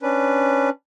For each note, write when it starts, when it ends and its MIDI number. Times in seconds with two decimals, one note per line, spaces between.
0.02 0.69 61
0.02 0.69 62
0.02 0.69 71